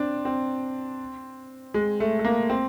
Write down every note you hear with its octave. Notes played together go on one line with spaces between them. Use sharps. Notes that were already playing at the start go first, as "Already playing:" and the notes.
Already playing: C4 D4
C4
G#3
A3
A3
A#3
C4